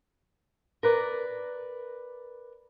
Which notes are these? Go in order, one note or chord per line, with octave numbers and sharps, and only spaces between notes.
A#4 B4 D5